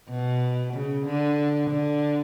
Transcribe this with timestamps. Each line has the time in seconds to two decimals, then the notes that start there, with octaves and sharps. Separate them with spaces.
0.09 B2
0.74 C#3
1.05 D3
1.70 D3